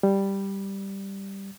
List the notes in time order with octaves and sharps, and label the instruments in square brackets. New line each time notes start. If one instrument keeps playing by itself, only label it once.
[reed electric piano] G3